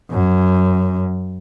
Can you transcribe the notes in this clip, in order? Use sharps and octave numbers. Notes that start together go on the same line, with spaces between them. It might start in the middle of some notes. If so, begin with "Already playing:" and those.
F#2